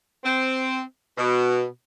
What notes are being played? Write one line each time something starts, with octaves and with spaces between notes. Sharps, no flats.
C4
B2